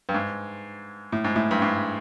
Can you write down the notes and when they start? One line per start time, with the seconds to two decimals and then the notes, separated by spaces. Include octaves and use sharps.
0.09 G2
0.14 G#2
1.12 A2
1.24 G#2
1.36 A2
1.51 G2
1.62 G#2